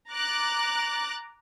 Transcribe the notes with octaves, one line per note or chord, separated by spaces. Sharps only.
A#5 D6 F#6 A6